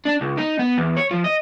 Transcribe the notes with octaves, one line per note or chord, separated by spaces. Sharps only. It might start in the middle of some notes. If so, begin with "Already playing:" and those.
D4
C#2
D#4
B3
E2
C#5
F3
D#5